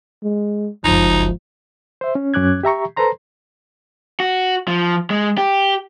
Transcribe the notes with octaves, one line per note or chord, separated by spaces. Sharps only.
G#3
F#1 C#2 F3 D#4
C5 E5
C#4
F#2 C#4 D6 F#6 G#6
G4 E5 A#5 C#6
A4 B4 C5 A#5 C6
F#4
F3
G#3
G4